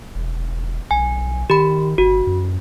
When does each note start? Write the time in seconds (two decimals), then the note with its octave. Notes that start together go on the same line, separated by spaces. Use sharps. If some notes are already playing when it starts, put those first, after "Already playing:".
0.15 E1
0.91 B1 G#5
1.50 D#3 G4 B5
1.98 G1 F#4
2.27 F#2